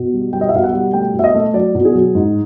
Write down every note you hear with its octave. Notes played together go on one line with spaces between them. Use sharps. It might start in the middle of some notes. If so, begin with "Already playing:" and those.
Already playing: B2
G3
G3 G5
D#5
E5
B2 F5
F#5
G3
A3 G5
B2
E5
D#5
A3
F#3 D5
B2
G#4
F#3
G#2